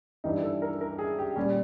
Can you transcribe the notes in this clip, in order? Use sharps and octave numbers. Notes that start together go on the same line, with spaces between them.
G2 E3 G3 D#4
A4
A#4
A#4
G#4
G4
A#2 G3 C#4